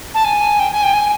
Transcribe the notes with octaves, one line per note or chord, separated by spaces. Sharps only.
A5
G#5
G5
G#5
G5
G#5